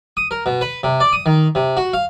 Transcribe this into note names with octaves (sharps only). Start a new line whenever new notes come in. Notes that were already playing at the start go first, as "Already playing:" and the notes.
D#6
A#4
B2
B4
C3
D5
D#6
D#3
C3
F#4
F5